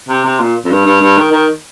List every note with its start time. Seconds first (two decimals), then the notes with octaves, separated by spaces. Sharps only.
0.09 C3
0.24 C3
0.40 A#2
0.65 F2
0.71 G2
0.86 G2
1.01 G2
1.17 D#3
1.32 D#3